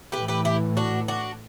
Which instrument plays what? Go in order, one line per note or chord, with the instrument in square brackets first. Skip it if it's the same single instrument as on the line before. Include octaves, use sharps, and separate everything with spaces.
[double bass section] A2 E3 A3 [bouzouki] G4 B4
[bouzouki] G4 B4
E4 G4
D4 F#4
D4 F#4